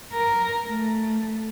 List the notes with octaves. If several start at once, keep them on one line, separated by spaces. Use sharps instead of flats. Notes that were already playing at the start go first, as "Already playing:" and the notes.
A#4
A3